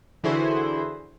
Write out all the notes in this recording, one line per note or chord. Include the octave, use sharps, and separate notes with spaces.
D3 E3 E4 F#4 G#4 C5